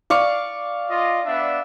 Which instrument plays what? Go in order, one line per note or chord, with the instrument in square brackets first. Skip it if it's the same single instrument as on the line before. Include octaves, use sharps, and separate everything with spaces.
[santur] D5 F5 C#6
[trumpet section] F4 D#5
B3 D4 E5